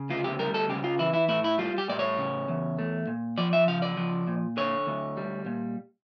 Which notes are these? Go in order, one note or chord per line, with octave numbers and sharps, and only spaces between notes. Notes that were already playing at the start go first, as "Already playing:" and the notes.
Already playing: C#3
D2 F4
G4
G3 A#4
A4
C#3 G4
F4
E3 E4
E4
A2 E4
E4
G3 F4
G4
A2 D5
C#5
C#3
E2
A3
A#2
F3 D5
E5
C#3 F5
D5
F3
A#2
D3 C#5
D2
G3
A#2